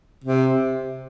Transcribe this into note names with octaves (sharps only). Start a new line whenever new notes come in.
C3